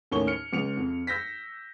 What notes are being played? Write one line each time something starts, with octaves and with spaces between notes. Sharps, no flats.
D#2 A2 C#4 C#6 G7
F6 C#7
C#2 C#7 F7
F2
E6 G6 A#6 B6